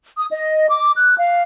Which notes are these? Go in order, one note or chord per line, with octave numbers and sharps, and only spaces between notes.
D#6
D#5
D6
F#6
F5